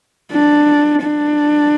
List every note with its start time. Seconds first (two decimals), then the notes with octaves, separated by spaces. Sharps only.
0.32 D4
1.02 D4